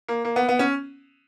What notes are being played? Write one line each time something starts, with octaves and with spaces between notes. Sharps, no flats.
A#3
A#3
B3
B3
C#4